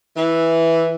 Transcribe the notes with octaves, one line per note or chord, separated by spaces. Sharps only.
E3